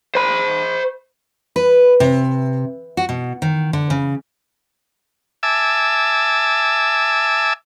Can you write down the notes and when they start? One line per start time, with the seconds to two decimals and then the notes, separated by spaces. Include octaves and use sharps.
0.15 C5 B5
1.56 B4
2.00 C3
2.97 F#4
3.09 B2
3.42 D#3
3.73 D3
3.90 C#3
5.43 E5 G#5 A5 D6 E6